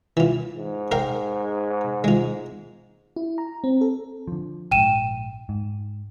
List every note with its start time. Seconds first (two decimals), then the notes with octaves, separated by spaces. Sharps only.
0.17 E3 F4
0.56 G#2
0.91 A#4 F5 G5
2.04 G#3 F4
3.16 E4
3.38 A#5
3.64 C4
3.81 A4
4.28 D3 F3
4.71 A#1 G#2 G5 D#7 E7
5.49 G#2